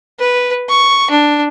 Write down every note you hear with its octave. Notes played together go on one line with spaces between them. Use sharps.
B4
C#6
D4